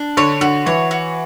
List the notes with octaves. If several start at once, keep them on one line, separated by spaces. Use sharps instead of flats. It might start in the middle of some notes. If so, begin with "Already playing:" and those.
Already playing: D4
D3 C#5
D3 F#4
E3 C#5
F#4